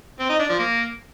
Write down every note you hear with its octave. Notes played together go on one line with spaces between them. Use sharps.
C4
D#4
D4
F3
A#3